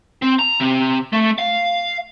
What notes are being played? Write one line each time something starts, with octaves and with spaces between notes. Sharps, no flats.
C4
A#5
C3
A3
F5